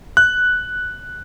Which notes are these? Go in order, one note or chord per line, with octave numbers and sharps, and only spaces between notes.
F#6